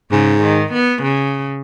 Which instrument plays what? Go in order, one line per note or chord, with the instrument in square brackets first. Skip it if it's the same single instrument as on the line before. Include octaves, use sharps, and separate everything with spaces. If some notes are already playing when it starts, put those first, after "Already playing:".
[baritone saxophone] G#2 [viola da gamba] C#3
[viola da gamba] D#3
B3
C#3